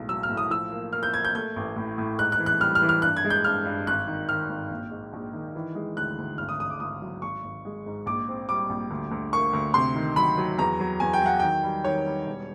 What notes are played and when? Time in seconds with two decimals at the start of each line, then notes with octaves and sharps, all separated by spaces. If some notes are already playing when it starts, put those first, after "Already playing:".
Already playing: B1 A2 G#3
0.09 F#3 E6
0.23 F6
0.29 A2
0.37 D#6
0.50 F3 E6
0.71 A#3
0.93 A#3 F6
1.03 G6
1.13 A#3 G#6
1.25 G6
1.35 A3 G6
1.56 A1
1.76 A2
1.98 A2
2.18 G#2 F#6
2.32 F#6
2.39 E3
2.46 F#6
2.60 G3 F6
2.75 F6
2.82 E3
2.89 F6
3.02 G2 F#6
3.17 G#6
3.24 G#3
3.30 G6
3.44 G2 F6
3.65 G2
3.87 G#1 F#6
4.07 D#3
4.29 D#3 F6
4.49 G#1
4.71 A#1
4.91 G#2
5.13 A#1
5.33 D#3
5.55 E3
5.75 G#3
5.97 D2 F#6
6.18 D2
6.38 G#1 F6
6.49 D#6
6.60 G#1 D#6
6.70 D6
6.80 G#1 D#6
7.02 F#3
7.22 G#1 C#6
7.44 G#1
7.65 G#3
7.86 G#2
8.06 A#1 D6
8.28 C4
8.49 G3 D6
8.70 A#1
8.90 D2
9.11 D2
9.33 A#3 C#6
9.53 D2
9.74 C3 C6
9.95 D#3
10.16 F#3 B5
10.38 F#3
10.58 E2 A#5
10.80 F#3
11.00 E2 G#5
11.13 G5
11.21 F#3 F#5
11.39 D#3 G5
11.63 G3
11.84 D#3 C#5
12.06 G3
12.26 E1